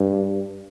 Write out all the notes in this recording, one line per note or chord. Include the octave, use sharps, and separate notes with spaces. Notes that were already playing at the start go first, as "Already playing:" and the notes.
Already playing: G2